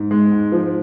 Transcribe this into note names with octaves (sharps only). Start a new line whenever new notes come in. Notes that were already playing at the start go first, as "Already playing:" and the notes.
Already playing: G#2
G#3
G#2
F3